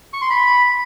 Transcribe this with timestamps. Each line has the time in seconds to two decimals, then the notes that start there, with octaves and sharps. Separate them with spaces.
0.13 C#6
0.22 C6
0.30 B5